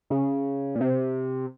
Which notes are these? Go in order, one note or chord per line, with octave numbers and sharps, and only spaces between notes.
C#3
A#2
C3